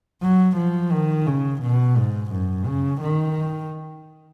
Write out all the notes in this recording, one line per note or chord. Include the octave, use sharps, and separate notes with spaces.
F#3
F3
D#3
C#3
B2
G#2
F#2
C#3
D#3